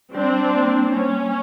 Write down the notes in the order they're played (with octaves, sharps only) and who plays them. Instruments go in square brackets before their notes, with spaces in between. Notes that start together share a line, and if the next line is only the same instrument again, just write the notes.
[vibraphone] G3 [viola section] C4 D4
[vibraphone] A#3
[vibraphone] G3 [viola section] C#4